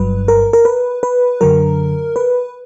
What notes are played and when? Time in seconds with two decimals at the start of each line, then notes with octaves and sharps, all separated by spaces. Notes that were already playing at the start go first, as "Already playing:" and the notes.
Already playing: G1 G2 F#3 B4
0.28 A#4
0.53 A#4
0.65 B4
1.03 B4
1.41 F#2 D3 F#3 A#4
2.16 B4